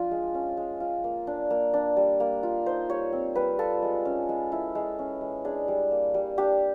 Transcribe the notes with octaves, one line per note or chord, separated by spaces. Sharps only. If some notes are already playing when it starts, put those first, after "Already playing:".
Already playing: F3 D4 F4
G#3
C#4
G#3
F4
A#3
D4
A#3
D4
G3
A#3
F4
D#4 C5
G3 C#5
C4
G3 B4
F4 A4
G#3
C#4
G#3
E4
G#3
C#4
G#3
D4 G#4
G3
A#3
G3
D4 G4